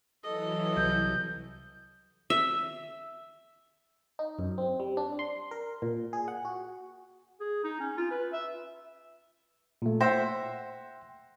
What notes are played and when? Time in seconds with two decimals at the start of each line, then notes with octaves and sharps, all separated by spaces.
0.24 E3 F#3 A4 D#5
0.77 C2 G6
2.30 E5
4.19 D#4
4.39 F#2
4.58 C4
4.80 G3
4.97 D4
5.19 C6
5.51 A#4
5.82 A#2
6.13 G#4
6.28 F#5
6.45 F#4
7.40 G#4
7.64 D#4
7.80 C#4
7.97 F4
8.11 B4
8.33 E5
9.82 A#2 A3
10.01 C5 E5 F#5 G5 A#6